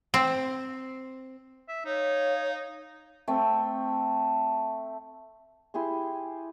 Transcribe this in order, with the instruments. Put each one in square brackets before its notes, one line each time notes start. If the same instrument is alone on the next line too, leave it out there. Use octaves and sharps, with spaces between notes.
[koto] C4
[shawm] E5
[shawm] D#4 [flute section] C#5 F5
[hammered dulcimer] A3 C4
[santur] E4 G4 G#4 C6